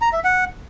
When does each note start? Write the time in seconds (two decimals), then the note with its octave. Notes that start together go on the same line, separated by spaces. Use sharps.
0.01 A#5
0.13 E5
0.24 F#5